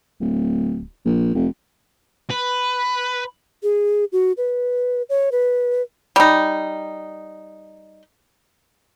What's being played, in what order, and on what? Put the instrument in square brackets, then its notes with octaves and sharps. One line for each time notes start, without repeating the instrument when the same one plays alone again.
[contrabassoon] D1
A#1
F1
[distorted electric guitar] B4
[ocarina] G#4
F#4
B4
C#5
B4
[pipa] G3 D#4